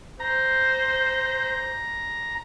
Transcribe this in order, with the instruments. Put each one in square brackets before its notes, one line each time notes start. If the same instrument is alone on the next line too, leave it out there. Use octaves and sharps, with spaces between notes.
[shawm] C5 [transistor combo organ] A#5